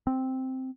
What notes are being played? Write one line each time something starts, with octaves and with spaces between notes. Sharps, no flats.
C4